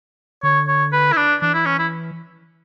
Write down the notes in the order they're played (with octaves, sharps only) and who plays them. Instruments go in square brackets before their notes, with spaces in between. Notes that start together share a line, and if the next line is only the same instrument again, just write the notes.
[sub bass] D3 [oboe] C#5
[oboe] C#5
B4
E4
D4
[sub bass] E3 [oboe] D4
[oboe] E4
C#4
E4